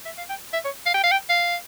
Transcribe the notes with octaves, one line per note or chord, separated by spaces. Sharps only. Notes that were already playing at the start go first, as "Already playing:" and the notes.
E5
F5
G5
E5
C#5
F5
G5
F5
G5
F5